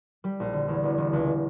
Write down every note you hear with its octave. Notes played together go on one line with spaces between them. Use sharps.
G3
A#1
D3
E2
E1
E1
C#2